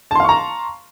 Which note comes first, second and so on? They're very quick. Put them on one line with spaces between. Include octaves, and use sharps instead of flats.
A5 C6 F5 C#6 A#5